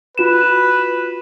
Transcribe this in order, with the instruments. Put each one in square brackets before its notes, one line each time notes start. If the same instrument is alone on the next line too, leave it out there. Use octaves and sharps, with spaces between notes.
[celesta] F4 F#4 E7 [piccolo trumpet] B4